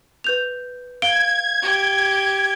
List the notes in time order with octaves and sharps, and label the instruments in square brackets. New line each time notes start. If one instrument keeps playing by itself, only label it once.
[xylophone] B4 G6 F7
[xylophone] F5 D7 G7 [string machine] G#6
[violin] G4